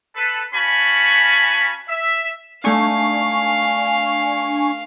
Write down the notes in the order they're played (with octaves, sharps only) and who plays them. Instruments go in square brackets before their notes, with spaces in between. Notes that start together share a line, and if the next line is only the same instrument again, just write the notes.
[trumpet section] A4 B4
C#4 F#4 F5 G#5 A5 B5
E5
[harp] A3 D#4 [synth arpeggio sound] D4 G#5 C#6 [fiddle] F5